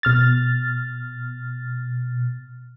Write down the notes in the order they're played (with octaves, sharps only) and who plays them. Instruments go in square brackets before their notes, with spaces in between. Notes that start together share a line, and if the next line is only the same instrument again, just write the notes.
[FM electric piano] B2 F6 A6